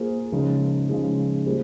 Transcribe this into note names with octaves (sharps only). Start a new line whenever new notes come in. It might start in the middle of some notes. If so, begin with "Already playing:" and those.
Already playing: A#3 F4 G#4 C5
C#3 F3 G#3 D#4 G#4
C#3 F3 G#3 D#4 G#4
G3 A#3 F4 G#4 C5